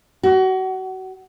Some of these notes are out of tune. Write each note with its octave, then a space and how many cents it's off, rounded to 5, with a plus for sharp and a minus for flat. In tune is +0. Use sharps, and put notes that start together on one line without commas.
F#4 +30